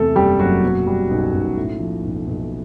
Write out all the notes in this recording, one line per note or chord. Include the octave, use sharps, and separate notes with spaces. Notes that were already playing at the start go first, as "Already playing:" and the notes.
Already playing: E2 C3 A3 A4
F#1 G3 G4
F#1 F#3 F#4
B2
G3
B1
B1
A2
F3
B1
B1